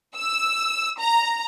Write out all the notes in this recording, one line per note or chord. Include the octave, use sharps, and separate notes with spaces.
E6
A#5